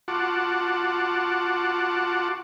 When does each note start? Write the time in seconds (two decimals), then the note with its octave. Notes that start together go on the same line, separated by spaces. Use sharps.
0.08 F4 F#4 F#5 A5 D6